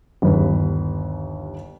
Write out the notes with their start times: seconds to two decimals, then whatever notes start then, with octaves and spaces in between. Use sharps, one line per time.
0.22 G1 D#2 B4